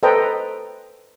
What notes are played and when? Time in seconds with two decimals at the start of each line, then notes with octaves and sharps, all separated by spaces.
0.03 A4 B4 C5 D#5 G5 A#5